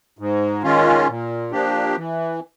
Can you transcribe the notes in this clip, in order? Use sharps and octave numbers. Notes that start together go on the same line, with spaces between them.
G#2
D#3 G#3 C#4 F4
A#2
F3 A#3 D4 G4
E3